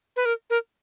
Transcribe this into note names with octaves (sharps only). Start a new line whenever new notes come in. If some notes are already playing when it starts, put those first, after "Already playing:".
B4
A#4
A#4